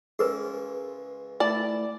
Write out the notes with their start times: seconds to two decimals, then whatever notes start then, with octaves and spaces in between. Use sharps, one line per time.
0.19 C#2 E3 G#4 A#4 B4 C6
1.40 A3 E4 D5 A5